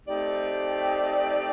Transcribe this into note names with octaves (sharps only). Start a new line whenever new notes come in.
A3 C4 D#4 G4 D5